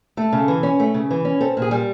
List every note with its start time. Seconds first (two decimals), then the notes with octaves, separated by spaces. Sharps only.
0.17 A3 A4
0.33 C#3
0.48 E3
0.63 C#4
0.80 A3
0.94 C#3
1.11 E3
1.25 C#4
1.41 C4 A4
1.57 A#2
1.62 G#4
1.71 G3